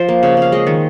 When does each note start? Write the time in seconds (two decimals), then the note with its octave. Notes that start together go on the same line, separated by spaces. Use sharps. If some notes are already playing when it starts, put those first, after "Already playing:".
Already playing: F3 C5
0.09 A#3
0.23 C#3
0.37 C#3 F5
0.52 G#3 D#5
0.67 D#3